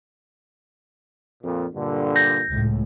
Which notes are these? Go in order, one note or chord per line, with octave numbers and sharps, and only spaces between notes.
F2 A#2
G2 A#2 D3
G6 A#6
C#2 A2